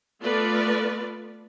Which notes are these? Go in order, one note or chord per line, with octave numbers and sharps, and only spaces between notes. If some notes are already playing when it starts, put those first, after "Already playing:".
A3 B3 F4 A4 B4 D5